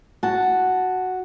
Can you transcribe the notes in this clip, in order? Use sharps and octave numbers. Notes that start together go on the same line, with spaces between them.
F#4 A5